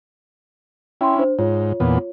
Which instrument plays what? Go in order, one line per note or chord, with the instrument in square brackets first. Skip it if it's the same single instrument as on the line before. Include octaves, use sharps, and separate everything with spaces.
[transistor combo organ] C#4 E4 [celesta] G5 C6
[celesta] D4 C5
[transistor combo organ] G#2 [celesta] F4 C#5
[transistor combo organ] E2 A#2 B3